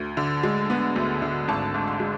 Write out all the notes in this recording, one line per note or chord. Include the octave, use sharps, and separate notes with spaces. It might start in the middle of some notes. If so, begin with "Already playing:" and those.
Already playing: D2
D3
G#3
B3
D2
D3
G#1 A5
G#2
C6
G#3